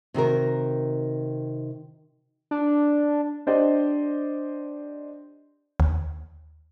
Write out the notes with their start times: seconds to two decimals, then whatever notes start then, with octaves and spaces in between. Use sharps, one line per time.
0.14 C3 D#3 F#4 A#4
2.51 D4
3.47 D4 G4 C5 D5 D#5
5.80 D#2